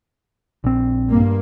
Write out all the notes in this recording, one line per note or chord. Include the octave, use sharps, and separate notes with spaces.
A#1 C4
G2 A#3